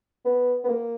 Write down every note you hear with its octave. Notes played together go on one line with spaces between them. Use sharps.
B3
B3
A#3